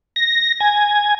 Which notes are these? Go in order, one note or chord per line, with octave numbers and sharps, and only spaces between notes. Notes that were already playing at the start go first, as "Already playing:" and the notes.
A#6
G#5